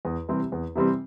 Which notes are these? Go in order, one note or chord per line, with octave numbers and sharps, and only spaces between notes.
E2
C3 E3 G3 C4
E2
C3 E3 G3 C4